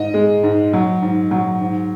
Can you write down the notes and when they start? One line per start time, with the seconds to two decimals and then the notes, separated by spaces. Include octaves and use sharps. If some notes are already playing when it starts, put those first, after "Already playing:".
Already playing: G#2 D#5
0.14 G#3
0.43 G#2
0.73 F#3
1.02 G#2
1.31 F#3
1.61 G#2